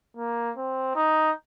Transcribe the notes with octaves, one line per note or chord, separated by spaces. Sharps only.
A#3
C4
D#4